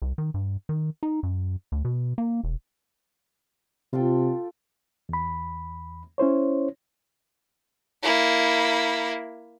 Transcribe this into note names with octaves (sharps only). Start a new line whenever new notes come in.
C2
D#3
G2
D#3
D#4
F#2
D2
B2
A#3
E1
C3 F4 A4 G5
E2 B5
C#4 E4 C5 C#5
A#3 E4